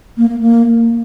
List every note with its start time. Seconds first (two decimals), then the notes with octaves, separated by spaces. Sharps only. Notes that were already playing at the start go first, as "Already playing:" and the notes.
0.17 A#3
0.29 A#3
0.40 A#3